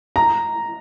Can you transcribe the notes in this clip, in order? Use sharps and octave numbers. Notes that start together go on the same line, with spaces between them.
A#5